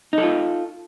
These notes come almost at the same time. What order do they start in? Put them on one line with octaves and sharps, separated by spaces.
D#4 A4 F4